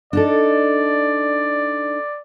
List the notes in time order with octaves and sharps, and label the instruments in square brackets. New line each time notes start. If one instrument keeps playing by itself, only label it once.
[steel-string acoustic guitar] D4 D#4 A4 [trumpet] D5